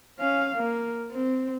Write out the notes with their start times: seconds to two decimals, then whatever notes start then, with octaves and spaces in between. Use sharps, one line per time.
0.19 C#4 F5
0.55 A#3
1.11 C4